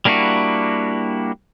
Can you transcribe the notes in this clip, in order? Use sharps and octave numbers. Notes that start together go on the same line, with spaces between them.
G3 A#3 D4 E4 F#4